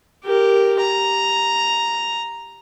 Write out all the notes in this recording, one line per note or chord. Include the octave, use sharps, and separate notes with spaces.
G4 A#4
A#5